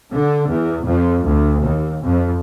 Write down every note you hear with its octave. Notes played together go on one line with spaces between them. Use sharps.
D3
E2
F2
D2
D#2
F2